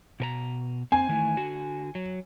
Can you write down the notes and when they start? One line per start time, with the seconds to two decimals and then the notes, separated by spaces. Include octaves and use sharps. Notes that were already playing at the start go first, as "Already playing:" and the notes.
0.20 B2 A#4 A#5
0.92 C4 G#5
1.09 D#3 E3 A3
1.37 D3 F#4
1.95 F#3